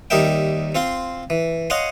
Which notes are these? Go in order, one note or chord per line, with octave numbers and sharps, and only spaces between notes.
D#2 G3 D#4 A#4 E5 G5
C4 F4 F5 C6
E3
C#5 D#5 F5 F#5 G#5 C6